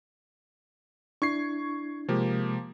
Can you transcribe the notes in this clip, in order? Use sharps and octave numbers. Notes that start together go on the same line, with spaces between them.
D4 E4 C#6 G#6 C7
C3 F3 G#3 A#3 G4